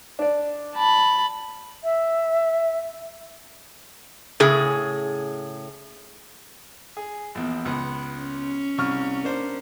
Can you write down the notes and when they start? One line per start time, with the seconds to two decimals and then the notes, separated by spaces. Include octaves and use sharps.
0.19 D4 D5
0.75 A5 B5
1.84 E5
4.40 A2 C#3 G#4
6.97 G#4
7.35 A#1 E2
7.65 C#2 B3
8.19 C#4
8.78 C2 C#6 F6
9.24 A#3 D4 C5